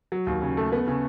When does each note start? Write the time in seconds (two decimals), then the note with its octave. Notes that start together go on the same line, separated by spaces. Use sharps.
0.12 F#3
0.27 D#2
0.42 C#3
0.57 A3
0.72 B3
0.87 C#3